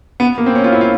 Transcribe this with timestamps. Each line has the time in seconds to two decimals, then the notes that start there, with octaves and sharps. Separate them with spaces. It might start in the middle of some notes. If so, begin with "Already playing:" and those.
0.20 B3
0.38 A#3
0.46 C4
0.55 C#4
0.64 F4
0.72 E4
0.81 F4